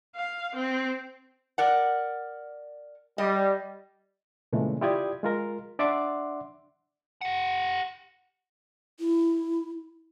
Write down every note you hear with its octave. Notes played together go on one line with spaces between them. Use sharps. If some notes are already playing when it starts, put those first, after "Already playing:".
F5
C4
A#4 D5 F#5
G3 D#5
A#2 C#3 E3 G#3 A3
E4 F4 G4 D5 D#6 G#6
G#3 F4 A#4
D4 D5 E5 F#5 C6 D6
G4 F#5
E4